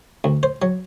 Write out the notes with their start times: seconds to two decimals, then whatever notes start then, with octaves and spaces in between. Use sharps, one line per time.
0.24 D2
0.43 C5
0.62 F#3